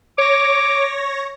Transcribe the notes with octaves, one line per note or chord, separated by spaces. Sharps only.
C#5 D6 A#6